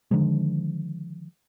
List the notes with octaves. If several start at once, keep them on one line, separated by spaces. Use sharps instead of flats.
D3 D#3 F3 G#3